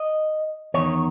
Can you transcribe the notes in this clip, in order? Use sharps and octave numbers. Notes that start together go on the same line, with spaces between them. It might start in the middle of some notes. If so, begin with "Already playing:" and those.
Already playing: D#5
E2 D#3 C#5